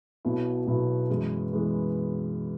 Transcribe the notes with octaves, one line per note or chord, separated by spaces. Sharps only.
B1 B2 F#3 B3 E4
B1 B2 F#3 B3 E4
F#2 E3 G#3 B3
E3 G#3 B3